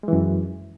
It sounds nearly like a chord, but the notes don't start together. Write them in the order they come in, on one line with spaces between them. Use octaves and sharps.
G#3 E3 F#2